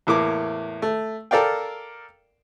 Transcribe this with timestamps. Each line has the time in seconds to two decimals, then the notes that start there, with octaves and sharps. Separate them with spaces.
0.07 E2 A2 A#3 D6
0.82 A3
1.31 A4 A#4 D5 F5 G5